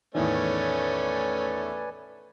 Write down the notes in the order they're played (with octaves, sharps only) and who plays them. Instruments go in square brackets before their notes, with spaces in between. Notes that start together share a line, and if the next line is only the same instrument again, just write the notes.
[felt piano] E2 A2 D#3 [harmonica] A3 C#4 [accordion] B4 D5 G#5